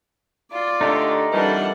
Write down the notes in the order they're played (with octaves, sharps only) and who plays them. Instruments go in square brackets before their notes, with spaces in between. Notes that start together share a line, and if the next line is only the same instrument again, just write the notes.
[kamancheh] F4 [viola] D5
[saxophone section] D3 A3 [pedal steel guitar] D#4 G4 A#4
[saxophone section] F2 D#3 E3 [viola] G3 F#5 [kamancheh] D4 A4